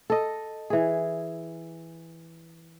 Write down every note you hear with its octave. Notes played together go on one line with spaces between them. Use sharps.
A4 D#5
E3 G#4